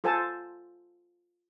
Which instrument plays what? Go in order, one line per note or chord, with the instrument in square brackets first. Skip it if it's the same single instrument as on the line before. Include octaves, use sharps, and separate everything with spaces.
[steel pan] F4 A4 C5 G#5 A5